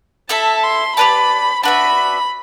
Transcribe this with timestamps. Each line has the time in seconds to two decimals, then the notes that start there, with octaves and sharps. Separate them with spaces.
0.29 E4 A4 E5 A5
0.64 C6
0.97 G4 B4 D5 A5 B5
1.63 D4 F#4 B4 E5 B5